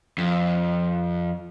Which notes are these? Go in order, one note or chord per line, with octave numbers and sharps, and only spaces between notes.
F2